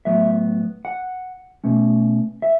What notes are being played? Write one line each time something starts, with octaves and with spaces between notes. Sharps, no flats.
A2 F#3 B3 E5
F#5
B2 A3 C#4
E5